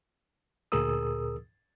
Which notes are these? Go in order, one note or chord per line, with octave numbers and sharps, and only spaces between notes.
D2 A#2 G#4 A#4 D#6 E6